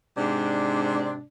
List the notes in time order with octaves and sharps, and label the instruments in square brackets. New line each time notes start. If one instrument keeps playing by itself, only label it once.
[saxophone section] G#2 C3 D4